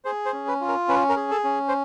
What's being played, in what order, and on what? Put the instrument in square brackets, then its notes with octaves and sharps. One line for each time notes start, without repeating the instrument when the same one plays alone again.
[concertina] G#4 C5
C5
C#4
B4
F4
A#4
C#4 B4
A#4
G#4
A4
C#4
C5